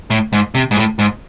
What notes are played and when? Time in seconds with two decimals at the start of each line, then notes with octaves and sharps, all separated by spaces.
0.10 A2
0.33 G#2
0.55 C3
0.71 G#2
0.77 A2
0.99 G#2